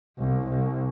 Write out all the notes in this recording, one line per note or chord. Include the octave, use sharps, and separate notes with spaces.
C2
C2